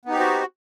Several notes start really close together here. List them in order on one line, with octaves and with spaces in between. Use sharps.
B3 D#4 G4 C4 F#4